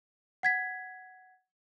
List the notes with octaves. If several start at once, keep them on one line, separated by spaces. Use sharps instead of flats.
F#5 G#6 B6